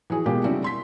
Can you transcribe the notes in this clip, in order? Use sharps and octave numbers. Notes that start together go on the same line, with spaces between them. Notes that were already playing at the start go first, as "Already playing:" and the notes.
E3 F#4 G#4
B2 G#3 A#3 F4 G4
C#3 G3 C4 D4 E4 F#4
C6 B6